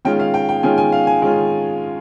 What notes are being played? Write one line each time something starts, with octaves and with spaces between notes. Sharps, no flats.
D#3 G#3 C#4 F4 G5
F5
G5
G5
D#3 G#3 C#4 F4 G#5
G#5
F5
G#5
D#3 G#3 C#4 F4